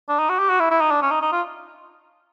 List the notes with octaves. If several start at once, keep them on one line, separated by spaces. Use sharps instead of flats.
D4
D#4
F#4
G4
F#4
E4
E4
D#4
D4
C#4
D#4
D#4
F4